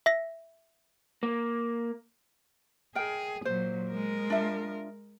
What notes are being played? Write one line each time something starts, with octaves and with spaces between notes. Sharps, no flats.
E5 A#6
A#3
G#4 A#4 D#5 G5
A#2 F#3 C5
G#3 A#4
D4 F4 E5